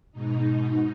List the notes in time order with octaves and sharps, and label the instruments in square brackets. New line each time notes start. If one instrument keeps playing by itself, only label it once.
[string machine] G#2 B2 D#4